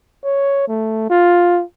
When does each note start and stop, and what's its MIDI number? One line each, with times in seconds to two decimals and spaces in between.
0.25 0.68 73
0.68 1.07 57
1.10 1.63 65